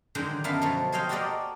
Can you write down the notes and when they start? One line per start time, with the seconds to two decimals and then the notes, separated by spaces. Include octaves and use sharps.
0.15 D3 D#3 F#3 G#3 F#5 G5
0.44 F#2 B3 A#4 E5 F5 A5
0.62 B2 F3 F#3 A3
0.92 G#4 A4 C5 D#5 F5 G5
1.09 F#4 G4 A4 A#4 D5 D#5